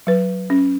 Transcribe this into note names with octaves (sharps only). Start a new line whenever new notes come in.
F#3 B4
C#4